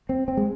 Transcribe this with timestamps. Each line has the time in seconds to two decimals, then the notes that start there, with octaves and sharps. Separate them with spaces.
0.09 C4
0.28 C4
0.37 G#3